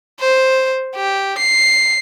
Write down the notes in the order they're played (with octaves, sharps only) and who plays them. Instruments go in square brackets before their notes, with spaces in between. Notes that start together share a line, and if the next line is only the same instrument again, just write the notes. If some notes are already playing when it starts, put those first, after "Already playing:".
[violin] C5
G4
C7